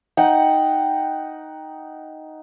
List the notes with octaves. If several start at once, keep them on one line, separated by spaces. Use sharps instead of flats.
D#4 F#5 G5